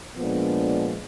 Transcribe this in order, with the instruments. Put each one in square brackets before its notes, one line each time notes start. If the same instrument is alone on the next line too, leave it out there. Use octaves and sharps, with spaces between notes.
[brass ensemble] A#2 F3 G#3 B3 D4